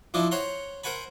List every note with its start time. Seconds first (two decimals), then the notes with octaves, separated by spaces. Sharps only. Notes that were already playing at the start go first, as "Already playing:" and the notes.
0.14 F3 D4 E4 D#5
0.31 C5 C#5 F#5 A#5 C6
0.84 A#4 C5 F#5 G#5 B5